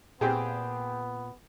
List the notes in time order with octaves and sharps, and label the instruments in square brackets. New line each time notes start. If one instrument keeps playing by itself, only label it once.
[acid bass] A#2 [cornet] B3 [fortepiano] C4 G4 G#4